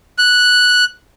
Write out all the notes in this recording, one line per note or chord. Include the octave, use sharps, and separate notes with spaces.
F#6